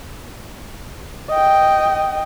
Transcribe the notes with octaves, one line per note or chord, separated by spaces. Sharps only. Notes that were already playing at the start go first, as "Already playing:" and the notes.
D#5 G5